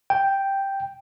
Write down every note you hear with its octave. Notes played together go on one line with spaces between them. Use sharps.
G5